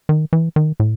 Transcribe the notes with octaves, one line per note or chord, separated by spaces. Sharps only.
D#3
E3
D#3
A2